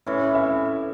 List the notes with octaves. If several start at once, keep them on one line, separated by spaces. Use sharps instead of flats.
A2 E3 C#4 E4 C#5
E5